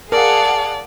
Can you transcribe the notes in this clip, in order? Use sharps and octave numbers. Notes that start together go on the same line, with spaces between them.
G#4 A#4 D5 F5 F#5 A5